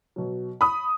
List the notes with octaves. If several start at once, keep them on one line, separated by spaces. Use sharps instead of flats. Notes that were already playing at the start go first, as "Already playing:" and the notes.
B2 F#3
B5 D#6